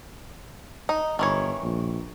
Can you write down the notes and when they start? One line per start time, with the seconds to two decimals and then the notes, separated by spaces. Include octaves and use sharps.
0.89 D#4
1.19 G1 D#3 E3 C#5
1.63 A#1